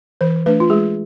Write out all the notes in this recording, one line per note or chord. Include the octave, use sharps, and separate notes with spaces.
E3 C5
A3 D4 B4
F4
G#3 G#4